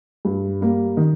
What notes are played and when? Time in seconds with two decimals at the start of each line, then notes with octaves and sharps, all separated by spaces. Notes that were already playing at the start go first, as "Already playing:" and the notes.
0.25 G2
0.61 G3 A#3
0.97 D#3